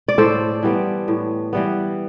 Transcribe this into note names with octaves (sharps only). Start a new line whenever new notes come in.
D5
A2 A4 C5
E3 G3 B3
A2
E3 G3 B3